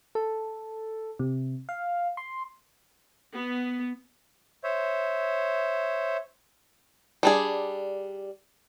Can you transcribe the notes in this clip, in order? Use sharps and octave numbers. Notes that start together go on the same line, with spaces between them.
A4
C3
F5
C6
B3
C5 C#5 E5
G3 D4 G#4